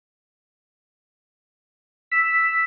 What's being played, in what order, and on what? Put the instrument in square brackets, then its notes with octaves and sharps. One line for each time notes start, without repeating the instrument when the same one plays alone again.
[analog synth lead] E6 [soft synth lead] B6